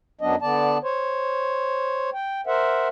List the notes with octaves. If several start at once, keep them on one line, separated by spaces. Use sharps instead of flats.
F#2 F#3 B3 D4 D#5
D3 B3 D5 A5
C5 C#5
G5
A#4 C5 E5 F#5